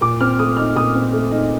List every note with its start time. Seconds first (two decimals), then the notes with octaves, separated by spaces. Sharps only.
0.01 A#2 D6
0.21 C4 F6
0.39 A3 D#6
0.57 D#4 F6
0.76 A#2 D#6
0.95 C4
1.13 A3
1.31 D#4